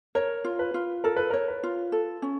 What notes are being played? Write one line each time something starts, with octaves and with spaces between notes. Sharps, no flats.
A#4 C#5
F4
B4
F4
A4 A#4
B4
A#4 C#5
B4
F4
A4
C#4